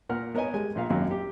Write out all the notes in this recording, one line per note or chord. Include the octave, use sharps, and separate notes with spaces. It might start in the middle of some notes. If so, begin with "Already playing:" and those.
A#2 A#4 F#5 F6
B3 A#4 C#5 D#5 G#5
G3 G#3 G#5
A#1 A#2 F5
G#1 F#2 A#3
G4